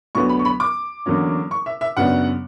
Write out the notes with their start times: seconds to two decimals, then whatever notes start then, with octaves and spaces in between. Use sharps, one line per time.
0.15 D2 D3 F#3 B3 C#6
0.29 B5
0.39 C#6
0.45 B5
0.60 D6
1.06 E2 D3 F#3 A#3 C#4
1.51 C#6
1.66 E5
1.81 E5
1.97 F#2 C#3 F#3 B3 D4 F#5